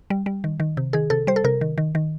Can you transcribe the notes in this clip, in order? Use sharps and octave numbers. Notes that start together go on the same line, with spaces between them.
G3
G3
D#3
D#3
C3
D#3 G#4
C3 A4
G3 C5
A4
C3 A#4
D#3
D#3
D#3